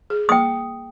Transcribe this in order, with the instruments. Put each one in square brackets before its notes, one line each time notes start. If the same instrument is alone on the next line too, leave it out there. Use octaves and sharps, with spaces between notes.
[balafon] G#4
[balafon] A#3 [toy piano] G5 D#6